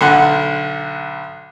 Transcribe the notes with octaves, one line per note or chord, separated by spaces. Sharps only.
B1 D3 F#5